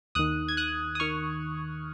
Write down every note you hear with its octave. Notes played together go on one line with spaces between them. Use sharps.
D#2 D#3 D#6 F#6
G#6
D#6 F#6
D#6
D#3 C#6 F6